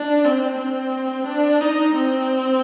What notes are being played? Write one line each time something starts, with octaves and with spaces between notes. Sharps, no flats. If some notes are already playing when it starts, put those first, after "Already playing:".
Already playing: D4
C4
C4
D4
D#4
C4